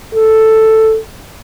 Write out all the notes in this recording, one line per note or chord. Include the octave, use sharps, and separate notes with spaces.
A4